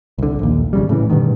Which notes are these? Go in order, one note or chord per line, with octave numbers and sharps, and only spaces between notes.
C2 D3
A#1 D#2
G#1 C#3 G3
A2 C#3 E3
G2 B2 D3 D#3